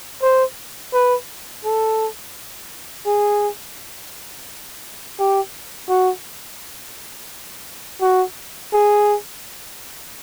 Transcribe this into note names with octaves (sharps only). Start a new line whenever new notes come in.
C5
B4
A4
G#4
G4
F#4
F#4
G#4